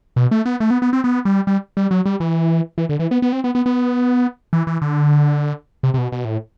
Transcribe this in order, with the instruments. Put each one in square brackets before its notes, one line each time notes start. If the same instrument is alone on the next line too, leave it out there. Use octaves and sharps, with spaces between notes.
[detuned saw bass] B2
A3
B3
A3
B3
B3
C4
B3
G3
G3
G3
F#3
G3
E3
E3
D3
E3
B3
B3
C4
B3
B3
B3
E3
E3
D3
C3
C3
B2
B2
A2